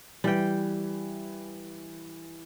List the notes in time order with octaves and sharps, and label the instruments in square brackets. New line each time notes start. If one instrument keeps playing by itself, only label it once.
[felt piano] E3 [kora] G3 G5